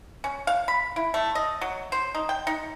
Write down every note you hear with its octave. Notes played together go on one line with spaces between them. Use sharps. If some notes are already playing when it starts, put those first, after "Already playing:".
C#4
F5
B5
E4
A3
D#5
F#3
C5
D#4
G5
D#4